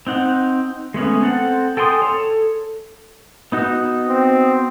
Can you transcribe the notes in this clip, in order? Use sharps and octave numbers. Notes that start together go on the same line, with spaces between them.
C4 D#4 F#5
G#3 A3 B3 C#4
C4 A4 F#5
A4 G5 G#5 C6 D#6
A4 C#5
B3 D#4 F#4
C4